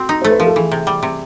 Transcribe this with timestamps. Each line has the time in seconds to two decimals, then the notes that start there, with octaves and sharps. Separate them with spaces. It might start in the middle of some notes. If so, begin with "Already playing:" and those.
Already playing: C4 F#4
0.09 D#4
0.22 A3 C5
0.30 B4
0.38 F3 A#4
0.47 A4
0.56 E3 G#4
0.71 C3
0.87 G3
1.03 C3